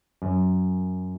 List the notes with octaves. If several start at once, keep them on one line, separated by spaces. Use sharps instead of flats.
F#2